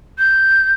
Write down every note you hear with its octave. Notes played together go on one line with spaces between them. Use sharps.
G6